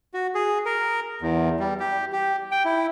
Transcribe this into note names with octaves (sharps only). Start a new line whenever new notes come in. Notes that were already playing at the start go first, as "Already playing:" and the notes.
F#4
G#4
A#4
E2
G3
G4
G4
G5
E4